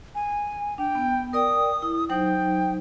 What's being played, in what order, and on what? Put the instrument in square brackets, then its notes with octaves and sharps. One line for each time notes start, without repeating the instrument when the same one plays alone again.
[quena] G#5
[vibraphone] D4 [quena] G5
[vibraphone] B3
[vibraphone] A#4 D5 G5 [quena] D#6
[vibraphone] E4
[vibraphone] F#3 D#4 C5 [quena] G5